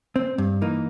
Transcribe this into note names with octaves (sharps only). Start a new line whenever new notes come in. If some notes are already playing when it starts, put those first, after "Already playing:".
C4
G2
E3 A#3 D#4